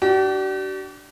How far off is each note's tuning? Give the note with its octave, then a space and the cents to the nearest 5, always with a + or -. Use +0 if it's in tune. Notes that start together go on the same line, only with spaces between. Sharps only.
D4 +0 G4 -45